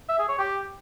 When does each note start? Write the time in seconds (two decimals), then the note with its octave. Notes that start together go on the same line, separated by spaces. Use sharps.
0.08 E5
0.18 G#4
0.28 C#5
0.39 G4